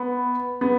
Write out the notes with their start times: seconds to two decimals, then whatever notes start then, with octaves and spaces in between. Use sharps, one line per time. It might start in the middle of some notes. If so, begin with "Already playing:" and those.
Already playing: B3
0.61 B3